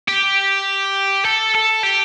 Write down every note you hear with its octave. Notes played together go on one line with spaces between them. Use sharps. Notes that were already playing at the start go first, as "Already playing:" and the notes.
G4
A4
A4
G4